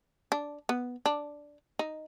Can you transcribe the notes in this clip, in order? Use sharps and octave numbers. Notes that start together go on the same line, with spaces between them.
D4
B3
D4
D#4